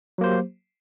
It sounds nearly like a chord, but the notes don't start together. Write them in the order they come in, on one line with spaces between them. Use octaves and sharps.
F#3 A#3 C5 G4